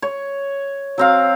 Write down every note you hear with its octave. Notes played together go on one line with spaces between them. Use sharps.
C#5
F#3 C4 F5